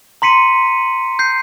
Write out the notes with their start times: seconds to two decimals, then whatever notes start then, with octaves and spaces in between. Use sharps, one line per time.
0.22 A#5 C6 B6 C#7 D#7
1.19 G6 C7